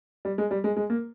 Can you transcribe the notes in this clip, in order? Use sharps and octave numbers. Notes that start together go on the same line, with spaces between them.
G3
G#3
G3
G#3
G#3
A#3